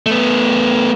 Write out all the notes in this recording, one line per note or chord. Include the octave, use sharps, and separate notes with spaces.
A3 B3